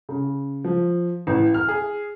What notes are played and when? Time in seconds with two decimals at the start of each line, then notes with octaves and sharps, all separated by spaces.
0.09 C#3
0.64 F3
1.27 A1
1.54 F6
1.68 G#4